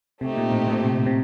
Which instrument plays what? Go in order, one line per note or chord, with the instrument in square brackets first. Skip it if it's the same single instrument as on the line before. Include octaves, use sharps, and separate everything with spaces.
[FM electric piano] C3 [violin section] A3 C4 D#4 G4
[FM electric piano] A#2
A2
A#2
C3
C3